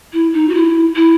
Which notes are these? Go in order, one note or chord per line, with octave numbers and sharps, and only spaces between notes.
E4
D#4
F#4
E4
E4